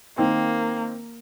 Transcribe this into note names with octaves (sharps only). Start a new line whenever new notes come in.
D#3 A#3 C4